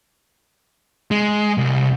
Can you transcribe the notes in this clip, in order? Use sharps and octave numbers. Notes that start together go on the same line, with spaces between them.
G#3
C2